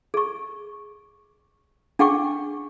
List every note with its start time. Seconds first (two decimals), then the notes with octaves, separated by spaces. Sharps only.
0.14 G#4 C#6
1.99 D4 G#4 F#5 G5 C#6 D6